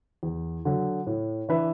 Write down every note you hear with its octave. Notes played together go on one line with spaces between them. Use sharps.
E2
D3 F#3
A2
E3 D4 B4 E5